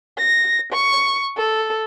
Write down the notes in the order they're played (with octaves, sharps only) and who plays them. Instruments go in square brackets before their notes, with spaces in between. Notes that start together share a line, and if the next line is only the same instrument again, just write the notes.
[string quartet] A#6
C#6
A4